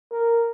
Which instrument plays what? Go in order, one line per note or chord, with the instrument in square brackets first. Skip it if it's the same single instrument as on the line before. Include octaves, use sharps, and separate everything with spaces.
[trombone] A#4